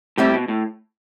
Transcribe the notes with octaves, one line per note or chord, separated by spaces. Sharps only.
A2 G3 C4 E4 G4
B2
A2